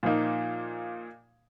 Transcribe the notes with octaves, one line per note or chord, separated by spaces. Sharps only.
A#2 F3 A#3 D#4